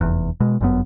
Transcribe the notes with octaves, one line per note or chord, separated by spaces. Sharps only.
F1 E2
B2 G#3
G1 F#2 B3